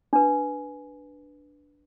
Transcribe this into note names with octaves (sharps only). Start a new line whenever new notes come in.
D4 B4